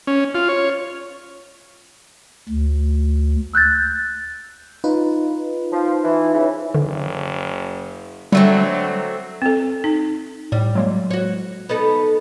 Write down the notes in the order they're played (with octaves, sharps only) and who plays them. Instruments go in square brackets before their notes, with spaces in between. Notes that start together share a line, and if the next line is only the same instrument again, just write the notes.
[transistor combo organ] C#4
F4
C#5
[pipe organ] D2
[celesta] E6 F#6 G6 A6
[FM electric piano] D#4 F4 B4
[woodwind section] F3
E3
C#3 E3
[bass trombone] F#1 [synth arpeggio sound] D3
[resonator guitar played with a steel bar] D3 A3 C4 [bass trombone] F#3 [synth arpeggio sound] G3
[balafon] C4 A4
D#4
[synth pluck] A2 [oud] G3
[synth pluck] F#3 G#3 A#3
[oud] F#4 C#5
B3 D#4 A4